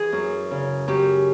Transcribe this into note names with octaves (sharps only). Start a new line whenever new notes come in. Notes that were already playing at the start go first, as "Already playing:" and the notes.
Already playing: E3 G#4
F#2
C#3
F#2 G4